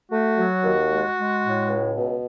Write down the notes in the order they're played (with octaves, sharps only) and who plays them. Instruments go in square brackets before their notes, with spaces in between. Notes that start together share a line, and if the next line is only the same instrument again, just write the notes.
[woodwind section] A3 F#4
F#3
D#2
G#3
G#3
A2
C#2
B2